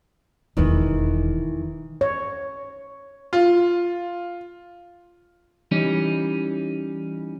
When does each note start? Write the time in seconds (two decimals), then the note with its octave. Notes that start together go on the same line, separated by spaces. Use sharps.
0.57 E1 E2 D#3 E3 B4
2.01 C#5
3.33 F4
5.71 E3 G3 C#4 D#4